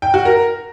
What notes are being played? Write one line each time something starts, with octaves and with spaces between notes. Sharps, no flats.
G5
F#4
A#4